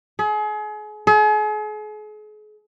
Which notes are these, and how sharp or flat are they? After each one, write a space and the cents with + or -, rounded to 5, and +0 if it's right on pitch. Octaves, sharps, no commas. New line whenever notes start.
G#4 +35
G#4 +40